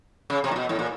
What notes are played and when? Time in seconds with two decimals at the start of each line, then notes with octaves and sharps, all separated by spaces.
0.30 C#3
0.44 C3
0.51 A#2
0.56 B2
0.69 A2
0.79 A#2